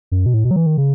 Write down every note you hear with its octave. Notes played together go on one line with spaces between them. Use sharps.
F#2
B2
A2
B2
F#3
E3
D#3
C#3